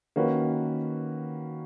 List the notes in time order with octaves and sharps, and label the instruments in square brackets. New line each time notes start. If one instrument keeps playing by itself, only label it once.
[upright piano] D#3 A#3 C#4 F#4 B4